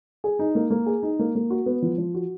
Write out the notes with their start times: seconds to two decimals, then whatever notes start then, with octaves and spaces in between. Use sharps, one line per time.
0.24 G#4
0.39 D#4
0.55 A#3
0.70 A#3
0.86 G#4
1.03 D#4
1.19 A#3
1.35 A#3
1.50 F#4
1.66 B3
1.82 F3
1.98 F3
2.14 F#4